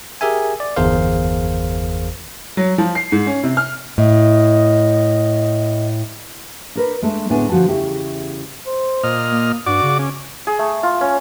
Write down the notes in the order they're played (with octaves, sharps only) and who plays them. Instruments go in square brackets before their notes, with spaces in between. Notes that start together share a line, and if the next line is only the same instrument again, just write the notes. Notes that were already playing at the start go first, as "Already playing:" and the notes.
[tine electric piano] G4 G#4 A#4 E5 G#5
D5
G1 E2 G#4 A#4 C5 F5
[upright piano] F#3
F3
C7
G#2
C#4
C3
F6
[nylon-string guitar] A2 [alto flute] D#5
[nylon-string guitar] D4 A#4 B4
G#3 A3 D4
D2 A2 G#3 B3 D4 G#5
D3 F3 F#4 G#5 A5
E2 C#3 A3 E4 G4
[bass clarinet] C5
[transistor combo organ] A#2 D#5 F6
[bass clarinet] A#3
[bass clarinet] G2 [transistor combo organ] F#4 D5 D6
[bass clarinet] C#3
[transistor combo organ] C#4
[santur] G#4
A3
F4
C#4